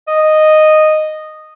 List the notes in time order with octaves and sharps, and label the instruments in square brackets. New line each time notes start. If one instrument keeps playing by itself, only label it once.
[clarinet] D#5